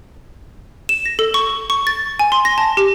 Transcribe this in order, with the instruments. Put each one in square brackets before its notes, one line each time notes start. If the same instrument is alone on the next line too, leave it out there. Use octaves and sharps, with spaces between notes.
[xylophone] E7
A#6
A4
C#6
C#6
A6
G#5
C6
A#6
A5
G4